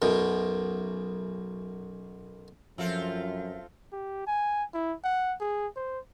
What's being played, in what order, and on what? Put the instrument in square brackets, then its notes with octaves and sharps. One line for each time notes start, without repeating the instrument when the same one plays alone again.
[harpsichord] B1 F#2 B2
[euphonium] F#2 [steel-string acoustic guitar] F3 [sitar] C4 F4 A4 [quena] E5
[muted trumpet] G4
G#5
E4
F#5
G#4
C5